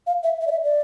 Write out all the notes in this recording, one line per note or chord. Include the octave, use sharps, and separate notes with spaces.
F5
E5
E5
D5
E5
D5